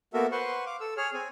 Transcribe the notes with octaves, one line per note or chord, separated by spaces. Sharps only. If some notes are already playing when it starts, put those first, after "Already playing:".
A#3 B3 F#4 A4 A#4 E5
B4 C5 F#5 C6 C#6
F5 D6
A4 E6
G#4 C#5 F6
C4 G#5